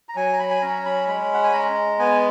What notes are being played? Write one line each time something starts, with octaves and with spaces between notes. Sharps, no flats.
A#5
F#3 G#5
A#5
B5
G#5
C#4 A#5
B5
G#3 B5
F#5
G#5
G#3 A#5
B3 G#5